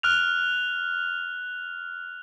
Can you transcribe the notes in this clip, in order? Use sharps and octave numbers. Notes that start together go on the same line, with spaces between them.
F6 F#6 F7